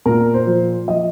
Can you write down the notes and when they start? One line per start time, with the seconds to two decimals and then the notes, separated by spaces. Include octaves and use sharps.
0.06 A#2 A#4
0.34 C5
0.47 F3
0.88 F3 D#5